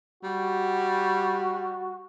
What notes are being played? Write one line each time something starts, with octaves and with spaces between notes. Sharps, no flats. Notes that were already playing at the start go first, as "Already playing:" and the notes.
G3 F#4